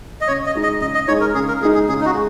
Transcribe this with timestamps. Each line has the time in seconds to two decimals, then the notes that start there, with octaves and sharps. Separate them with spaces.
0.21 D#5
0.28 C#3 C#5
0.46 D#5
0.55 G#3 D#4
0.63 D#5
0.81 C#3 D#5
0.95 D#5
1.08 G#3 D#4 C#5
1.21 A#4
1.35 C#3 G#4
1.48 A#4
1.62 G#3 G#4
1.65 D#4
1.74 G#4
1.88 C#3 G#4
2.01 D#4
2.06 F#4
2.14 G#3